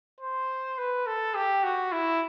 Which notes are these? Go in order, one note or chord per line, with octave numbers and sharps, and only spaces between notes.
C5
B4
A4
G4
F#4
E4